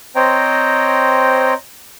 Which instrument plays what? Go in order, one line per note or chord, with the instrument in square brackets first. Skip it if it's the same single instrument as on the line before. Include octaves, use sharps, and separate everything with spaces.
[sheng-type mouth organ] C4 C5 C#5 D#5 G5 A#5